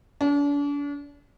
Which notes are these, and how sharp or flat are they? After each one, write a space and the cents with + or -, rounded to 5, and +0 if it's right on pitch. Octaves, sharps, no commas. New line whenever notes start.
D4 -40